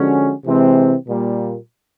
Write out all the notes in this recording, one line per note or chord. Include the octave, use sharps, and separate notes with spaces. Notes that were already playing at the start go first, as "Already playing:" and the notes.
Already playing: D3 F3 G#3 C#4 F#4
C3 E3 G#3 C4
A#2 G3 A#3